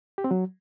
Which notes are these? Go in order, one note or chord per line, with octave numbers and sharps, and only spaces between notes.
G4
C4
F#3